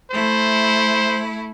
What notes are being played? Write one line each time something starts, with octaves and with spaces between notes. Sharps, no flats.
A3 E4 C5